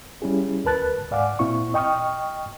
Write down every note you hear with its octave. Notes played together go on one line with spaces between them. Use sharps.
G3 C#4 E4 G#4
D2 A#4 B4 A5 F#6 A6
G#2 D5 F5 F#5 G#5 D6
A#2 C4 E4 C#6
D#5 G5 C#6 D#6 F6